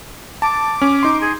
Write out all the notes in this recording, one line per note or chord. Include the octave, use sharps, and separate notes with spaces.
A5 D6
C#4
D#4 C6
G#4